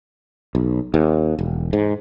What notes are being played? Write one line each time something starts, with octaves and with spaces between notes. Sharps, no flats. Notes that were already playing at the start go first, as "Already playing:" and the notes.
B1
D#2
E1
G#2